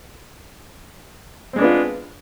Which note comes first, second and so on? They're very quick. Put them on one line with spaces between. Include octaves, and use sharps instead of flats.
C4 G#3 D4 B3 F4